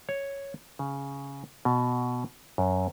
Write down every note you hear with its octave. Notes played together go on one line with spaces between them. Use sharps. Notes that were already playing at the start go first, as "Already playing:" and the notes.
C#5
C#3
B2
F#2